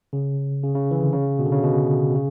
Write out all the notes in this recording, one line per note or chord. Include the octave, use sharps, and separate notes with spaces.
C#3
C#3
C#3
E3
D3
C#3
B2
D3
C#3
B2
C#3